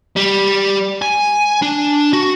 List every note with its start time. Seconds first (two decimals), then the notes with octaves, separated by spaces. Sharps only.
0.16 G3
1.02 G#5
1.62 D4
2.13 F#4